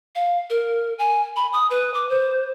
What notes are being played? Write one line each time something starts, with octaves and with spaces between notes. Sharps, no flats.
F5
A#4
G#5
B5
D#6
B4
D6
C5